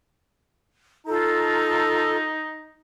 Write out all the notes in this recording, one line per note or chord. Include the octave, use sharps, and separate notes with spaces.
D#4 F4 A4 A#5